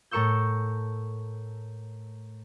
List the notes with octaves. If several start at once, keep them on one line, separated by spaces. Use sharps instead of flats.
A2 A4 A#4 C#6 E6 G6